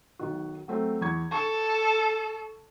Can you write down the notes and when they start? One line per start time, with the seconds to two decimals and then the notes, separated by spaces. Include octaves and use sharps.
0.19 B1 D#3 F#4
0.68 F#3 A3 C4
1.01 E2 C#6 G#6
1.31 A4 A5 C#6